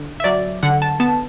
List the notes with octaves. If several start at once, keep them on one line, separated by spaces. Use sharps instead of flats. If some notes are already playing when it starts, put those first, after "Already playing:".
Already playing: D3
E5
F#3 D5
D3 F#5
A5
B3 A5